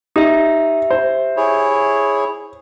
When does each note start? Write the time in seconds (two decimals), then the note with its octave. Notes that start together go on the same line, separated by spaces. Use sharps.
0.16 D#4 G4 E5
0.91 C5
1.37 E4 G#4 C#5